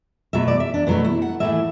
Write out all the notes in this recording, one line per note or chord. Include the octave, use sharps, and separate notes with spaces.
B2 F#3 A3 E5
D5
E5
D4
B2 F#3 A3 B3
E4
F#5
A2 E3 A3 E5